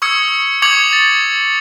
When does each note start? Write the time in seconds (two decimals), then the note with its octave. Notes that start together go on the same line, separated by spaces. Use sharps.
0.02 C#6 D#6 E6 G#6 C#7
0.62 C#6 D6 G#6 C#7 F7 F#7
0.93 A6